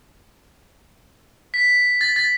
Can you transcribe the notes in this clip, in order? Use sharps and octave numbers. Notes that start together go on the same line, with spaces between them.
B6
A6
A6